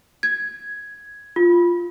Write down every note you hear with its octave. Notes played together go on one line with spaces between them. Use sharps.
G#6
F4